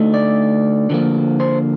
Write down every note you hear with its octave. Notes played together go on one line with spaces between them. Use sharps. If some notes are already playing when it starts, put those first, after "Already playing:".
Already playing: D3 A3 D#4
D5
D3 F3 A#3
C5